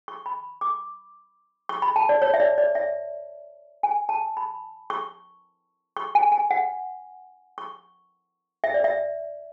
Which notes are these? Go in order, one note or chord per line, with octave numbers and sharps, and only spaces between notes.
C#6
B5
D6
C#6
B5
A5
D5
C#5
E5
D5
D5
E5
G#5
A5
B5
C#6
C#6
G#5
G#5
F#5
C#6
E5
D5
E5